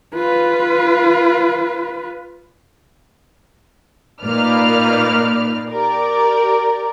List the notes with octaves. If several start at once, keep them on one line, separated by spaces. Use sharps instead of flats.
F4 B4
A#2 A#3 D#4 B4 D5 F6
G4 A#4 D5